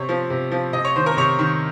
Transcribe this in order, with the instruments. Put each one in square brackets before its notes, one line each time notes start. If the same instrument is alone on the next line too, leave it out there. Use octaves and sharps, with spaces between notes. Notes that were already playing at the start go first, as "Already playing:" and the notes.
Already playing: [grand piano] C3 C#5
F3
C3
F3
C3 D#5
C#5
D#3 C5
A#4
C3 C#5
D#3